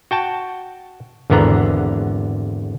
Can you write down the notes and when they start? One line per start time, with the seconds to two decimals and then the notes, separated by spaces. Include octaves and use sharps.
0.11 F#4 G5 A5
1.30 G#1 E2 D3 B3 A#5